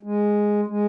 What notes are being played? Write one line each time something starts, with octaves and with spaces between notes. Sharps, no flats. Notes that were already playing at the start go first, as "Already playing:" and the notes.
G#3
G#3